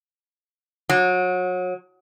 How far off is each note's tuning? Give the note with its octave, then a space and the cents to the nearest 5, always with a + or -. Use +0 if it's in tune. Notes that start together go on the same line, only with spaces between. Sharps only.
F#3 -30